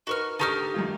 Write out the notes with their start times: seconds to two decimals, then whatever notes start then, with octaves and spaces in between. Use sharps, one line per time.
0.07 D#4 F#4 A#4 B4 C#6 F6
0.39 D3 D#4 G4 A5 A#5 C#6 D#6 F6
0.74 F#2 D#3 F4